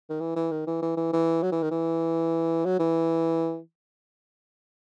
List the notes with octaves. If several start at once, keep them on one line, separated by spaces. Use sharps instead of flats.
D#3
E3
E3
D#3
E3
E3
E3
E3
F#3
E3
D#3
E3
F#3
E3